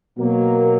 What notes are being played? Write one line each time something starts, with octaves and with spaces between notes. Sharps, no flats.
B2 F#3 A#3